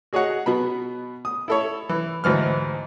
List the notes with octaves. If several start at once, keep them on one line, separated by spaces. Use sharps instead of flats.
F#4 G#4 C#5 D#5 F#5
B2 B3 B5
D#6
E4 A4 C#5
E3
D2 G#2 E3 F6